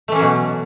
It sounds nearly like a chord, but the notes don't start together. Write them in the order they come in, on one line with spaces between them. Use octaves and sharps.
A3 E3 C#4 F#3 B2